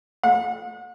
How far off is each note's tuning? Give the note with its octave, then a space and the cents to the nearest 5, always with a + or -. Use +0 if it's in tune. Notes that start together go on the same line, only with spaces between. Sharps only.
F#5 -40